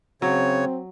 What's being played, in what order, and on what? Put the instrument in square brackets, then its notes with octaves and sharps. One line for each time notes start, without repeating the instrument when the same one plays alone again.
[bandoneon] C#3 C#5 [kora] F#3 [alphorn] C4